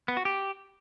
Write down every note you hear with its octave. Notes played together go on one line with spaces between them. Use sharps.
B3
F#4
G4